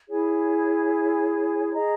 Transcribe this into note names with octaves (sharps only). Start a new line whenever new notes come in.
E4 G#4 C#5 G#5
G#4 D#5 A#5